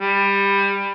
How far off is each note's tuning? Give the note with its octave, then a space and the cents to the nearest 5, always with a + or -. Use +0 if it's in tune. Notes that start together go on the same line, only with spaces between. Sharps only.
G3 +20